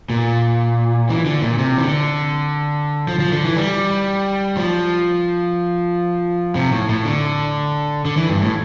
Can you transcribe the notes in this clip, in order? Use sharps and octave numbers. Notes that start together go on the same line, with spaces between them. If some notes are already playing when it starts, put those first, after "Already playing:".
A#2
E3
D3
A#2
C3
E3
D3
F3
F3
D3
E3
G3
F3
C3
A2
A2
D3
D3
E3
G2
A2